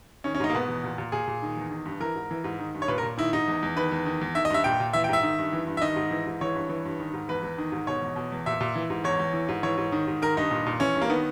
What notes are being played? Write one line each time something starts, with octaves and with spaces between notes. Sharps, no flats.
D#3 C#4
C#4
G#2 D#4
A#3
B2 B3
E2
A#2
A#2
A#2 G#4
A#2
D#3
E2
D#3
G2
E3 A#4
G#2
E3
G#2
D#3
G2
C#5
A#2 B4
A#4
A#2
D#3 E4
G#2 D#4
E2
E2
D#3 B4
E2
D#3
E2
D#3 E5
D#5
G2 E5
A#2 G5
A#2
E3 E5
G5
G#2 E5
D#3
G2
E3
G2
E5
D#3 D#5
G#2
E3
G#2
E3 C#5
G2
E3
G2
D#3
G#2
E2 B4
E2
D#3
G#2
B2 C#5
E2
B2
E2
A#2 E5
A#2
E3
G#2
E2 C#5
E2
E3
G#2
E3 C#5
G#2
D#3
G#2
D#3 A#4
G2 D#4
A#2
A#2
E3 C#4
G2
A#3
D#3 B3